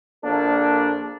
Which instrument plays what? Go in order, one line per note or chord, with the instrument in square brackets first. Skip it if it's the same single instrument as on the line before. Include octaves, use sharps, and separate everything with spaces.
[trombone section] A#1 A#3 D4 A4